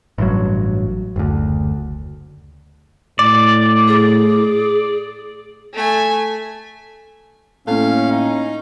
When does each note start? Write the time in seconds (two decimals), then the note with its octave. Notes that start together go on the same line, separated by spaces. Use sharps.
0.18 A1 G2 F#3
1.16 F#1 D2
3.19 A2 D5
3.88 G#4
5.73 A3 G#5
7.67 A2 A#3 C4 C#4 A4 F5
8.11 D#4